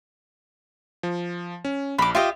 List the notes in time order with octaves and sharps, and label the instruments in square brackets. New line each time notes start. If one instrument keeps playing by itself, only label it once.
[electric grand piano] F3
C#4
[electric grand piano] A#1 [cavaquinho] B5 D6
[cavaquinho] F4 G4 D#5 [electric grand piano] E5